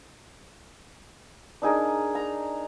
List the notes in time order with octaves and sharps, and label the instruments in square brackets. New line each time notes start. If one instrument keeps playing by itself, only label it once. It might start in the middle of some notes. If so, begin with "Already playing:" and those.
[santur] D4 D#4 G#4 A#4
A#5